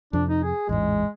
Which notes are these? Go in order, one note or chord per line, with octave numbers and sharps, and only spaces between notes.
F2 C3 D4
D#4
G#4
A1 E2 G#2 G#3